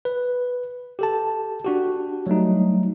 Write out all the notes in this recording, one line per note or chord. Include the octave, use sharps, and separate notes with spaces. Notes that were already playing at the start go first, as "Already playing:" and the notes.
B4
G4 A4 A5
D4 F#4 G4
F#3 G3 A3 D#4